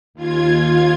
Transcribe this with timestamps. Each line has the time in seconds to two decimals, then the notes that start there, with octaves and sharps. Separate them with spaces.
0.14 D#2 F4 G#6